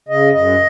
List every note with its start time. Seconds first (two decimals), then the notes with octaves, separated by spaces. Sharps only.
0.08 C#3 D#5
0.33 F#2 D#5